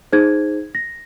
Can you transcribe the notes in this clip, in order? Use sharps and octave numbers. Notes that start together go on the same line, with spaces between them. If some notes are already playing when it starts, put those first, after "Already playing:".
D#4 G#4 C5 G#6
A#6